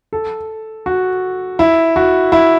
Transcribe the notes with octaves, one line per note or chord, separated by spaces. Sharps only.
A4
F#4
E4
F#4
E4